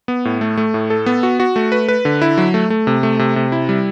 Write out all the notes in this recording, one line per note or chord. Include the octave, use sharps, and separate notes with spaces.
B3
A2
A3
A3
A2
A4
B3
F#4
F#4
A3
B4
B4
D3
E4
F#3
A3
A3
C3
A3
C3
C3
E4
G3